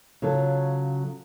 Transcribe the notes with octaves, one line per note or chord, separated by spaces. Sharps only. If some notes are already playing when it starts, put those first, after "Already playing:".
C#3 F#3 F4 A4